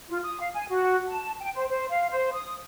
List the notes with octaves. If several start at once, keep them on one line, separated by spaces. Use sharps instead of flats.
F4
D#6
F5
G#5
F#4
A5
G5
C5
C5
F5
C5
D#6